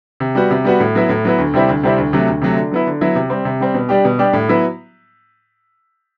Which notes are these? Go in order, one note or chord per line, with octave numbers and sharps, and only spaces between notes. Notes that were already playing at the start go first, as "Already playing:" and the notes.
C3
G3 B3 F#4
C3
G3 B3 F#4
A2
F#3 B3 E4
A2
F#3 B3 E4
D2
C3 G3 C4 E4
D2
C3 G3 C4 E4
D2
C3 F#3 A3
D2
C3 F#3 A3
D3
F#3 B3 E4
D3
F#3 B3 E4
C3
G3 C4
C3
G3 C4
B2
G3 D4 G4
B2
G3 D4 G4
A2
F#3 B3 E4